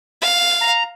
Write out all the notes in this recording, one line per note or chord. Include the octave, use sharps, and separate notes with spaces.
F5
A#5